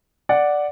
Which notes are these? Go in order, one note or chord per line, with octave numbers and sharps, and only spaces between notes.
D5 F#5